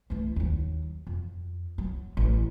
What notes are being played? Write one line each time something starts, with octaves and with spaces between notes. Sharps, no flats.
E3 A3
D#2 F#3
F2
F#3
A1